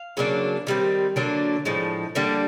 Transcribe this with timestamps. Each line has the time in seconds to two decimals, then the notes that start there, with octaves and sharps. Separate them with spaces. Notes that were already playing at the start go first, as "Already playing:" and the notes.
Already playing: F5
0.17 C#3 F#3 A#3 D4
0.67 D#3 G3 C4
1.16 D3 F#3 A#3 D4
1.65 A2 F3 G#3
2.15 D3 G3 A#3 D4